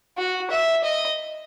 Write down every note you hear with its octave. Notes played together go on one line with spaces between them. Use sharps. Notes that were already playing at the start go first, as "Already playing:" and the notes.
F#4
E5
D#5